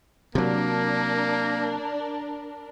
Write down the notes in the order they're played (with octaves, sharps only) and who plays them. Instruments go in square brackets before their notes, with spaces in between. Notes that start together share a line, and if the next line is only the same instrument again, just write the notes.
[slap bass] C3 F#3 [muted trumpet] A#3 [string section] D4 A#4